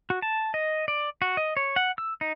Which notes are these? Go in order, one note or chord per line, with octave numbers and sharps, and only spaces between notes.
F#4
A5
D#5
D5
F#4
D#5
C#5
F#5
E6
D#4